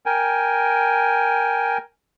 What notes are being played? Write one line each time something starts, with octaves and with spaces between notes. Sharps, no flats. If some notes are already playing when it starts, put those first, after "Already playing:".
A#4 G5 G#5